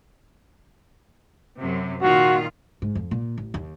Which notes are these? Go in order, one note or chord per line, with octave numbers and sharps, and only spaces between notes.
F#2 C3 F#3
A#2 D#3 F4 F#4
G#2
F2
A#2
A1
D#2